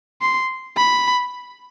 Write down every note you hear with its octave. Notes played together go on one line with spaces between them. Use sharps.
C6
B5